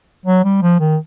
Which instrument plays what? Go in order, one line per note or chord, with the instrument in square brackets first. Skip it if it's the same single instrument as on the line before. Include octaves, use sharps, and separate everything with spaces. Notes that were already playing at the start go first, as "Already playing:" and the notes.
[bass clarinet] F#3
G3
F3
D#3